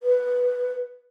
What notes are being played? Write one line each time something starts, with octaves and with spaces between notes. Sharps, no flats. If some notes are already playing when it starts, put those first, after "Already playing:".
B4